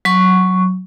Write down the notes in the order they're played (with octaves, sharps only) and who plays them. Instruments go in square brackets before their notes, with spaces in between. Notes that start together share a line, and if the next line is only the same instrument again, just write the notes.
[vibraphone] F#3 C#6